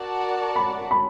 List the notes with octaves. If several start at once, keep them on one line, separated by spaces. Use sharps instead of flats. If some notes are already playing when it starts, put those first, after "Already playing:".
Already playing: F#4 A#4 D5 F#5 A5
B5
B5